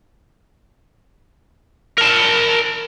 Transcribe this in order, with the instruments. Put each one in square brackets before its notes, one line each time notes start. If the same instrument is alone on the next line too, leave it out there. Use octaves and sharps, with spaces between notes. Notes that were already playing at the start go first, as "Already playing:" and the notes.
[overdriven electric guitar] A#4 A5